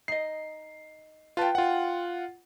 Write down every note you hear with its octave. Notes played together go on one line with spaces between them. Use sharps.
D#4 D#5 C7
F4 B4 G5 A5
F4 F#5